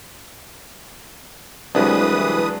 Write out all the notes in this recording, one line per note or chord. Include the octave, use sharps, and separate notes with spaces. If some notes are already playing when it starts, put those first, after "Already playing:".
C2 E3 F#3 G#3 D4 B4 D#6